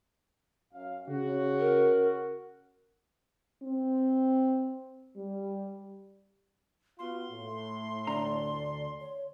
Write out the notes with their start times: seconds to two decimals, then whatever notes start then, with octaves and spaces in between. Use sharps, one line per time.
0.73 F#2 F5
1.08 C#3 C#4 F#4
1.58 A#4
3.63 C4
5.16 G3
6.99 B3 F4 F#4 C6
7.31 A2
8.07 D2 D4 D5 A#5
9.00 C#5